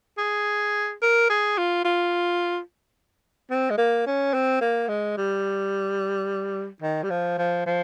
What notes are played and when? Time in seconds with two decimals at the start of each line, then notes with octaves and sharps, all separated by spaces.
0.18 G#4
1.02 A#4
1.30 G#4
1.58 F4
1.84 F4
3.50 C4
3.70 G#3
3.78 A#3
4.06 C#4
4.34 C4
4.61 A#3
4.88 G#3
5.17 G3
6.82 D#3
7.03 G3
7.10 F3
7.38 F3
7.66 F3